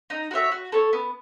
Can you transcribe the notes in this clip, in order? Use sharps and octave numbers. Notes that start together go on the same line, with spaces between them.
D#4
F#4 C#5 E5
F#4
A4 C#5
B3